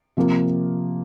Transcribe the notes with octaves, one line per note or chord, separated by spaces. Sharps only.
C3 F3 A#3